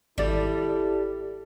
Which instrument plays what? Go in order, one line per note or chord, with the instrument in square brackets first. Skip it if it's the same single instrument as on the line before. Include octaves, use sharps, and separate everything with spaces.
[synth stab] G#1 D5 [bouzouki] G3 [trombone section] E4 A4